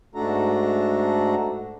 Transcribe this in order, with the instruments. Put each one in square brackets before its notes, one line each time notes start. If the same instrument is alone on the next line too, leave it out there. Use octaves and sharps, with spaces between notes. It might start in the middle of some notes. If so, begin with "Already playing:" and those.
[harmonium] G#2 A3 D4 F#4 A4 A#5